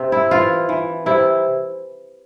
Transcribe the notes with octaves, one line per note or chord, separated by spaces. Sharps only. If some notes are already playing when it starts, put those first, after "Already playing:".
Already playing: C3 C4
E4
E3 F4
E3
C3 E4